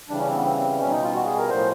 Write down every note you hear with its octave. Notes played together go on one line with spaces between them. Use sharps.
C#3 E3 G3 D4
C#4
C4
B3
C4
C4
B2 G3 C#4
D#4
F4
F#4
G#4
A#4
A2 F3 C5